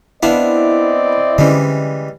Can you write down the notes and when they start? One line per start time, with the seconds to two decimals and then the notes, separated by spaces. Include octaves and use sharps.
0.23 B3 C4 D4 E4 D5 D#5 F5
1.38 D3 E3 G3 G#3 C#4